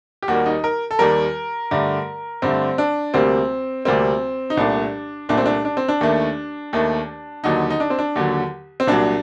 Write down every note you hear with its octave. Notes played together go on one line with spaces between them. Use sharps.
G4
D#2 D#3 G3 A#3 F#4
D#4
A#4
A4
D#2 D#3 G3 A#3 A#4
G2 D3 A3
G2 D3 A3 C4
D4
D2 C3 G3 A#3 C4
D2 C3 G3 A#3 C4
D#4
C2 A#2 A3 D4
C2 A#2 A3 D4
C4
D4
D4
C4
D4
D#2 D#3 A3
D#2 D#3 A3
D#2 D3 F#3 D#4
D#4
D4
C4
D4
D#2 D3 F#3
C4
C2 A#2 F#3 D4